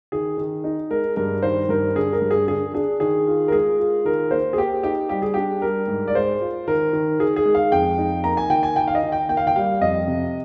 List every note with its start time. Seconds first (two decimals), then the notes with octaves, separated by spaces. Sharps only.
0.12 D#3 G#4
0.38 D#3
0.64 D#4
0.91 G#3 A#4
1.16 G2 A#4
1.43 D#3 C5
1.69 G2 A#4
1.95 D3 G#4
2.13 A#4
2.22 G2
2.31 G#4
2.48 D3 G#4
2.74 D4 G#4
3.00 D#3 G#4
3.27 F4
3.48 A#4
3.52 G#3 G#4
3.80 F4
4.05 D#3 A#4
4.31 A#3 C5
4.53 G#4
4.57 A#3 G4
4.83 D#4 G4
5.09 G3 G4
5.22 G#4
5.34 D4 G4
5.62 G3 A#4
5.88 G#2
6.08 D5
6.14 G#3 C5
6.41 F4
6.67 D#3 A#4
6.93 D#3
7.20 D#3 G#4
7.36 G#4
7.45 G#3
7.55 F5
7.72 F2 G5
7.98 D#4
8.24 A#3 A#5
8.37 G#5
8.50 D#3 G5
8.63 G#5
8.76 D#3 G5
8.88 F5
8.95 D#5
9.03 D#3
9.12 G5
9.29 A#3 G5
9.37 F5
9.47 G5
9.56 G3 F5
9.81 F2 D#5
10.08 C3